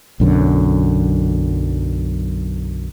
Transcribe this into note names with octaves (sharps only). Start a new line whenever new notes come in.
B1 F#2 D3